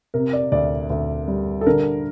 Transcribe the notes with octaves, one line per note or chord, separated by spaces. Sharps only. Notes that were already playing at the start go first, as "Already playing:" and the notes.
C3 A#4
D5
D2 D5
D2
G3
A4
D3 A#4